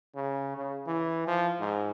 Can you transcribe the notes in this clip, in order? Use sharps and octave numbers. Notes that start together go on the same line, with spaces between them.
C#3
C#3
E3
F3
G#2